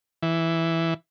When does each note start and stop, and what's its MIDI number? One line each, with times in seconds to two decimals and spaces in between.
0.23 0.94 52